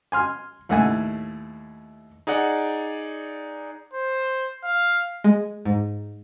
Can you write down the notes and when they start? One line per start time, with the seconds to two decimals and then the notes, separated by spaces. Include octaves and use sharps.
0.12 G#5 C6 F6
0.69 D#2 A2 A3 F#5 G#5
2.27 D#4 G#4 D5 F#5
3.93 C5
4.64 F5
5.24 G#3
5.65 G#2